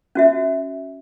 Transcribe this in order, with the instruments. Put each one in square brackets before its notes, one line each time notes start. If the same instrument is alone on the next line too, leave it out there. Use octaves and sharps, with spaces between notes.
[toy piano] C#4 F#4 E5